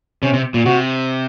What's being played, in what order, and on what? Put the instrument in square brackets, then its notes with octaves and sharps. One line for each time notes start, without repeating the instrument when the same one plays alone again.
[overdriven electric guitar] C3 [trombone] C#4
[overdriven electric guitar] C3
A#2
[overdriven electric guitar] C3 [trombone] F#4